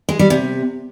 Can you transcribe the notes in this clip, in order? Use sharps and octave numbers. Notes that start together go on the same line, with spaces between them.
G#3
G3
C3